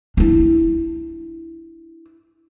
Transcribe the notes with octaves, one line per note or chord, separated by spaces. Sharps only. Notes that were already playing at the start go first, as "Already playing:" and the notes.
D4 E4